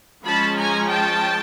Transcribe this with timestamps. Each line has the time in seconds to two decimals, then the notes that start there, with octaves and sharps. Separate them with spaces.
0.24 F3 G#3 C#4 A5 B5
0.56 G#5 A#5
0.89 G5 A5